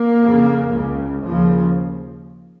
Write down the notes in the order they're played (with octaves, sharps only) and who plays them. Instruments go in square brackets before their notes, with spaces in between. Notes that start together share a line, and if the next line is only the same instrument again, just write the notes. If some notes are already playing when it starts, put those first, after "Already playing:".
Already playing: [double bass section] A#3
F2 C#3
C#2 C#3
D#2 C#3 F3